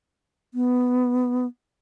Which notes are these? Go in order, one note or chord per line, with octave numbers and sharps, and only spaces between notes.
B3